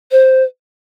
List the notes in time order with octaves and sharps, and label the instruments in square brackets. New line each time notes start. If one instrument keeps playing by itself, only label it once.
[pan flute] C5